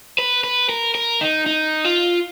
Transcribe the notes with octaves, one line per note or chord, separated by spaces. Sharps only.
B4
B4
A#4
A#4
D#4
D#4
F4